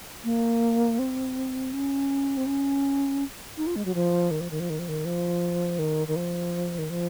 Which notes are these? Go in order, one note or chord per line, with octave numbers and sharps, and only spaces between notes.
A#3
C4
C#4
C4
C#4
D#4
F4
G#3
F#3
F3
D#3
F3
D#3
F3
D#3
F3
D#3
F3
D#3
D#3
F3
D#3
F3